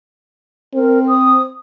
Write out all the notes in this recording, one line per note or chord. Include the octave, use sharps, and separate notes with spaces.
C4 A#4
D#6